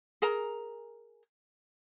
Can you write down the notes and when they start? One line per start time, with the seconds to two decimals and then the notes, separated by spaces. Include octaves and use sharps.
0.22 G#4 A#4 A#5